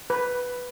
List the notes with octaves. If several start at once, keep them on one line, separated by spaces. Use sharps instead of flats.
B4